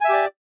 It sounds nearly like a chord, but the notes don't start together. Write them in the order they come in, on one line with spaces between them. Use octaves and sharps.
G#5 E5 G4 D5